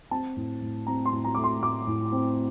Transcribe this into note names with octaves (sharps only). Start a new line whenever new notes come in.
C4 A5
A2
A2
C4 A#5
C6
A2
A#5
A3 D6
C6
A2 D6
A2
C4